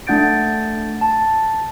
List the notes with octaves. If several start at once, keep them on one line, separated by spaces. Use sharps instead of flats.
A3 D4 F#5 G6 A6 D7
A5